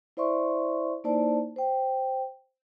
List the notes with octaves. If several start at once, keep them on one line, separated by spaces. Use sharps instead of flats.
E4 C5 D5 E5 C6 C#6
A#3 D#4 E4 C5 D5 A5
C5 G5